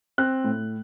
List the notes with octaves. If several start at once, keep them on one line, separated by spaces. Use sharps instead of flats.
C4 F#6
A2